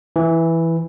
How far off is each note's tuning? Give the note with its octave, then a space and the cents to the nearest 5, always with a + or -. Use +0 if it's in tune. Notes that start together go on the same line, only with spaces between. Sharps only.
E3 +0